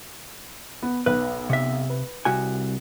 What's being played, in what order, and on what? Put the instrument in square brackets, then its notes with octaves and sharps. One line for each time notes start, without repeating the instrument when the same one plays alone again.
[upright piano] B3
[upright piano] B1 [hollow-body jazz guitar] B4
[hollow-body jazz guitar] C3 E5
[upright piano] B4
[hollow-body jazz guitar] C2 F#4 G#5